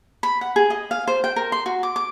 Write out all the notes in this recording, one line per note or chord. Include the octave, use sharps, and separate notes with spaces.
B5
F#5
G#4
D#5
F5
C5
G5
A#4
C6
F#4
D6
D6